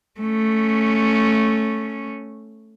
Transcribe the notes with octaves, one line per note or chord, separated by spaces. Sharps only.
A3 C#4